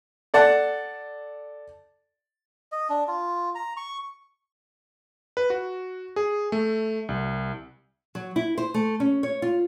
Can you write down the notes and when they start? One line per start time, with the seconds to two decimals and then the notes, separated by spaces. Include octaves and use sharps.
0.34 A4 D5 F#5 A5
2.72 D#5
2.90 D4
3.08 F4
3.55 A#5
3.77 C#6
5.37 B4
5.50 F#4
6.16 G#4
6.52 A3
7.09 C2
8.15 F#3
8.36 E4
8.58 C5
8.74 A3
9.00 C#4
9.23 C#5
9.42 F4